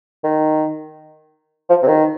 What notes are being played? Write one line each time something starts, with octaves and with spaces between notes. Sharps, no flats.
D#3
F3
C3
D#3